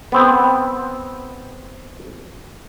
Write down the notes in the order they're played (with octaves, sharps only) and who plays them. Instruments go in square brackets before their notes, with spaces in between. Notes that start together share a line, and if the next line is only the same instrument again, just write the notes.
[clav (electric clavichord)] B3 C4